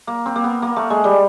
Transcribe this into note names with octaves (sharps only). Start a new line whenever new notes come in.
A#3
C4
A#3
B3
A#3
A3
G#3
G3